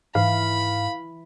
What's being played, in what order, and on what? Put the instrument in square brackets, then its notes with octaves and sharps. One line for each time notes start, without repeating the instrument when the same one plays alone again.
[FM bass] G#2 [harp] E3 [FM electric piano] F5 [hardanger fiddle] B5